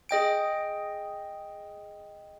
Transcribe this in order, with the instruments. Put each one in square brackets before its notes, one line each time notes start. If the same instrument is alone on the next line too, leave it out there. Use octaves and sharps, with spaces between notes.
[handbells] G#4 D#5 G5 D7